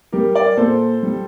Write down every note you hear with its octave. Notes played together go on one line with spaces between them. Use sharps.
G3 G4 A#4
A#4 D5
A#2 A4 C5
G3